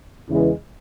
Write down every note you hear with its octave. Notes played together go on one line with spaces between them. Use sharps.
E2 C#3 E3 G#3